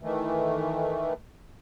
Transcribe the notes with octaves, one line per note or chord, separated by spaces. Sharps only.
D#3 E3 A3